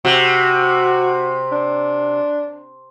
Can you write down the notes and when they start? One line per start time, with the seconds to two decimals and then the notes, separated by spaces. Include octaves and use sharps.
0.05 C3 F#4
1.51 D4